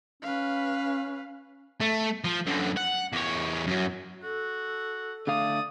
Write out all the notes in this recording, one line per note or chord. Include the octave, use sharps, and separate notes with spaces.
C#4 B4 F5
A3
F3
F#2 D3
F#5
E2 C#5
F#2 F#3
F#4 A4
D3 A3 D5 F5 D#6